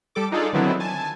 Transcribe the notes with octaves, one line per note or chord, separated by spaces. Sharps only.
G3 A4 D6
D4 D#4 F4 G#4 A4 D5
D3 D#3 F#3 B3 C4 E4
G#5 A5